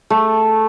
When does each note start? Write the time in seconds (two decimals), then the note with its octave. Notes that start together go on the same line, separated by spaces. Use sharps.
0.10 A3